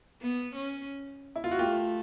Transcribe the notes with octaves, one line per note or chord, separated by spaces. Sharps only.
B3
C#4
E4
F4
F#4
A3 F4 G4